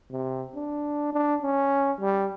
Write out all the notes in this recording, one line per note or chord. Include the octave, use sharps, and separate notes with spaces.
C3
D4
D4
C#4
G3